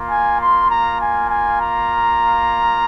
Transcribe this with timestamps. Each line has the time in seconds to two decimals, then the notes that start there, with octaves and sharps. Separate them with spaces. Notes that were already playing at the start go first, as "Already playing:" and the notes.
Already playing: A#3 F4
0.10 G#5
0.41 C6
0.70 A#5
1.01 G#5
1.30 G#5
1.60 A#5